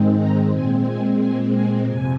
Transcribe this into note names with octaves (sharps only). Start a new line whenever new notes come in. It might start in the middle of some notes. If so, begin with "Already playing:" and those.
Already playing: G#2 D#3 G#3 C4
A#5
A#2 G#3 C4 G#5
G#5
G#5
G#5
F2 C3 G#5